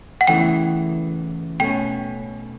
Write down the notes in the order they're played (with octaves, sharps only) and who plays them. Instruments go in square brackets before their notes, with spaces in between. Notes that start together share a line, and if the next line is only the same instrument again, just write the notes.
[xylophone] F#5
[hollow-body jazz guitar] E2 C#3 E3 A3 E4 [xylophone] G5
[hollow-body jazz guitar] B2 A3 C#4 [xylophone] G5